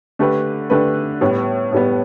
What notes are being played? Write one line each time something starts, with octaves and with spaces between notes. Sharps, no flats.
D3 A3 G4 B4
D3 A3 G4 B4
A2 G3 B3
A2 G3 B3